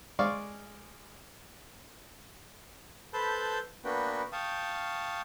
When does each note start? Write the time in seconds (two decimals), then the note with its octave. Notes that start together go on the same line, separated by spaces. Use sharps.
0.19 G#3 D5 F5 C#6
3.13 A4 B4 C5 A5 B5 G6
3.84 A#3 B3 D4 F#4 B4 G5
4.32 F5 G5 A5 C#6 D#6